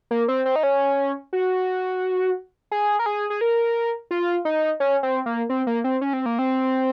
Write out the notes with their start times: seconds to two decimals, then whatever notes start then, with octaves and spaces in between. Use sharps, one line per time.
0.11 A#3
0.28 C4
0.45 C4
0.56 D#4
0.63 C#4
1.33 F#4
2.71 G#4
2.99 A#4
3.06 G#4
3.30 G#4
3.41 A#4
4.11 F4
4.45 D#4
4.80 C#4
5.03 C4
5.26 A#3
5.49 C4
5.67 A#3
5.84 C4
6.01 C#4
6.13 C4
6.26 A#3
6.39 C4